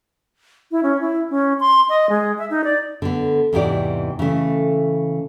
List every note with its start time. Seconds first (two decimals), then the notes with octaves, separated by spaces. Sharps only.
0.71 E4
0.83 C#4
1.01 E4
1.30 C#4
1.60 C6
1.89 D#5
2.09 G#3
2.38 E5
2.50 D#4
2.64 D5
3.02 D3 B3
3.53 E2 G#2 C3 E3 G4 D5
4.19 C#3 E3 A3